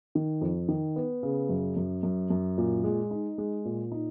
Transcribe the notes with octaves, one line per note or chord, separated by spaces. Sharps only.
D#3
F2
D#3
B3
C#3
F#2
F#2
F#2
F#2
A#2
G#3
D#4
G#3
A#2
D#4